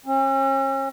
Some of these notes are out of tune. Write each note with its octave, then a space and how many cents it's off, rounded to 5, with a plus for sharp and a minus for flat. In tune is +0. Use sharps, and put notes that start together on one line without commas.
C#4 -40